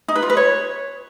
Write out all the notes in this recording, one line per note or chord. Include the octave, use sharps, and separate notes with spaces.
D#4
B4
F4
B4
C#5